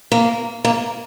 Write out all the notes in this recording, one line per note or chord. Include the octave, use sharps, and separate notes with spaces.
A#3
A#3